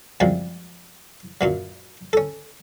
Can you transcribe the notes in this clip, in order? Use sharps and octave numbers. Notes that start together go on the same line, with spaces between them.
F#2 C3 F3 G3 G#3
F#2 A#2 F#3
C#4 A4